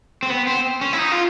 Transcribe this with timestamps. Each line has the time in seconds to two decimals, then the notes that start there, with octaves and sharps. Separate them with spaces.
0.23 C4
0.30 B3
0.47 C4
0.81 C#4
0.93 E4
0.99 D#4
1.12 F4